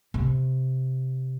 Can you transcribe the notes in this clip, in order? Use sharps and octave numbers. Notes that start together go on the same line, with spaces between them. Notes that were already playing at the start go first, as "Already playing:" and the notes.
C3